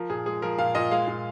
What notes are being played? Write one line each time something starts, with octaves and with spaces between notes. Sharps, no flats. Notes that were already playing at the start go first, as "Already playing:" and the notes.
Already playing: F3 A#4
A#2 G#4
G#3 G#4
F3 A#4
A#2 F5
A#2 D#5
G#3 F5
A#2